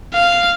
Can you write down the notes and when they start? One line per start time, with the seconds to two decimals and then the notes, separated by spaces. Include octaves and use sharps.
0.14 F5